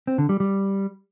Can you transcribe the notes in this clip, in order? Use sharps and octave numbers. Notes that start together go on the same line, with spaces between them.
C4
D3
G3
G3